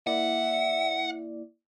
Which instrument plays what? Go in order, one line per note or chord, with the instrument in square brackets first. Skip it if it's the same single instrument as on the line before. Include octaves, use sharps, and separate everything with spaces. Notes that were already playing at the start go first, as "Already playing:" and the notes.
[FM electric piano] A#3 E4 D5 [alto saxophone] E5 [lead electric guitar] F#5